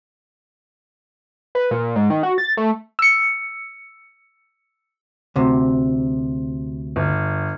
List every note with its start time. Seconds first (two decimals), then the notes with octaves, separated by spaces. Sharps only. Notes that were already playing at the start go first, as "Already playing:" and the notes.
1.55 B4
1.71 A#2
1.96 G#2
2.10 D#3
2.23 F#4
2.38 A6
2.57 A3
2.99 E6 C#7
5.36 D2 C3
6.96 G1